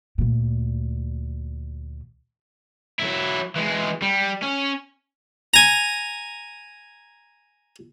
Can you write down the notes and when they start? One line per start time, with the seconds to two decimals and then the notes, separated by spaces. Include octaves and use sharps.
0.18 D2 A#2
2.99 F#3 E4
3.56 E3 G#3
4.02 G3
4.42 C#4
5.54 G#5 A#5